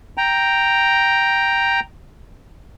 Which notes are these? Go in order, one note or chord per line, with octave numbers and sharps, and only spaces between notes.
G5 A#5